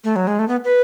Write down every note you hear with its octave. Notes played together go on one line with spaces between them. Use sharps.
A3
F#3
G#3
A3
B3
B4